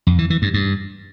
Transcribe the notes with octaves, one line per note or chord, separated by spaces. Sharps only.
F2
E3
E3
G2
G2